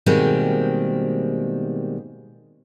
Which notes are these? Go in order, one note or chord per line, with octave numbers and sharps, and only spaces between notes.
B2 D#3 G3 G#3 A#3 C4